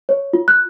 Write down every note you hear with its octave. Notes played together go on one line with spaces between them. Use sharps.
C#5
F4
F#6